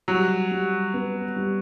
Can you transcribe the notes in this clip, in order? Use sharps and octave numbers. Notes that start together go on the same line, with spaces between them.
F#3 G3
G3
B3
G3